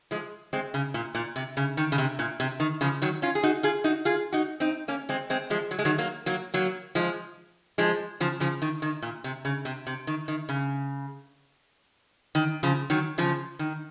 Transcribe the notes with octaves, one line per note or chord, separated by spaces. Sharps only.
F3 G#3
G#3 C4
C#3
A#2
A#2
C3
C#3
D#3
C#3
C3
A#2
C3
D#3
C#3 F3
D#3 F#3
C#4 F4
G#4
D#4 F#4
F4 G#4
D#4 F#4
F4 G#4
D#4 F#4
C4 D#4
A#3 C#4
G#3 C4
G#3 C4
F3 G#3
F#3
G#3
D#3 F#3
F#3 A#3
F#3 A#3
F#3 A#3
F3 G#3
F3 G#3
C#3 F3
C#3 F3
D#3
D#3
A#2
C3
C#3
C3
C3
D#3
D#3
C#3
D#3
C#3 F3
D#3 F#3
C#3 F3
D#3